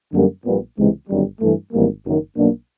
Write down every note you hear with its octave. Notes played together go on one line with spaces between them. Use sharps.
F#2 D3 G3 A#3
A#1 A#2 G3 B3
C#2 C3 E3 G#3
G1 F#2 D#3 G3
G2 E3 A3
G#1 G#2 E3 G3 A#3
F#1 F#2 D#3
B1 B2 F#3 A#3 D4